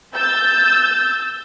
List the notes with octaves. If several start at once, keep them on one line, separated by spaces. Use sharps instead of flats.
E6 G6 A6